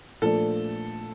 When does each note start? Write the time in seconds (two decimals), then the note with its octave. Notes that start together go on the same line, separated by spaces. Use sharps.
0.22 A#2 F3 A3 D4 A4